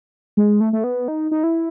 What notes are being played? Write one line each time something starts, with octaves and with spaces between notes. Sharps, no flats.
G#3
A3
A3
B3
D#4
D#4
E4